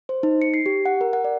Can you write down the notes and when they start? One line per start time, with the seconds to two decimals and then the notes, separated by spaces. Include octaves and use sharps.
0.09 C5
0.23 D#4
0.42 C#7
0.54 C7
0.66 G4
0.86 F#5
1.01 A#4
1.13 F#5
1.24 D5